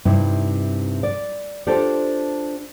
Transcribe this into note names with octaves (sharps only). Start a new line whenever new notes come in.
G2 C3 D#4 E4
D5
D4 F4 G4 A4 C5 D5